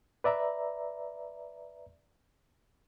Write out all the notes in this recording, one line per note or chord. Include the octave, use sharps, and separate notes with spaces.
B4 D5 E5 A#5